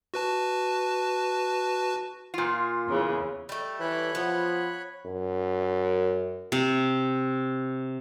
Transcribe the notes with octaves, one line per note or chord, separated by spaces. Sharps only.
F#4 B4 A5
A#2 F4
E2 C#3 E3
G3 A3
E3 C#5 B5 F#6
F3 B3
F#2
C3